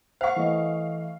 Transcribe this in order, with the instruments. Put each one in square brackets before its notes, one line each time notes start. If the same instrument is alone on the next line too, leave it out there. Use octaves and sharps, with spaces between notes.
[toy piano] C5 F#5 [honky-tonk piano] F5 C#6
[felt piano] E3 A3 D#5